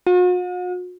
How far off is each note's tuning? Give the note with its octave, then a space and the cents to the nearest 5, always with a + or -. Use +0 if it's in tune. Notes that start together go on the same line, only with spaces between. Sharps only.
F#4 -45